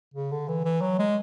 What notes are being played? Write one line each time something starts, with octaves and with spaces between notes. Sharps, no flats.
C#3
D3
E3
E3
F#3
G#3